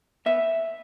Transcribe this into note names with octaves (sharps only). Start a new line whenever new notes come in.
B3 E5